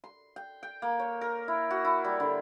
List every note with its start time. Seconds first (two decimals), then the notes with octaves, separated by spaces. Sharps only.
0.04 C6
0.36 G5
0.63 G5
0.82 A#3
0.99 C#5
1.21 A#4
1.48 E4
1.70 F#4
1.85 E4
2.04 G3
2.20 D3